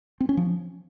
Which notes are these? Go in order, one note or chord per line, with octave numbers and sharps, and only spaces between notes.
C4
C#4
F3